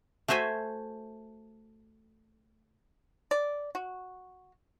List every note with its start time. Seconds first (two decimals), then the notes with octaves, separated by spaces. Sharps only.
0.28 A3 F#4 C5 E5 G#5
3.31 D5
3.75 F#4